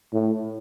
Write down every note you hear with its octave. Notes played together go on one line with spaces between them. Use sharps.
A2